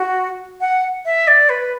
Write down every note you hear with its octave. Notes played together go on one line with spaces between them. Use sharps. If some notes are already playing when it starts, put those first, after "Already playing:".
Already playing: F#4
F#5
E5
D5
B4